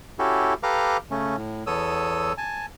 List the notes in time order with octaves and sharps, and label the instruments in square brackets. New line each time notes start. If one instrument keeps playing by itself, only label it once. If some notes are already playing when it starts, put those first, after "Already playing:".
[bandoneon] C#4 E4 F#4 G4 A4
G4 A4 B4 F5 A#5 D6
C#3 A3 C#4
A2
E2 B3 A4 C#5 D#6 E6
G#5 A5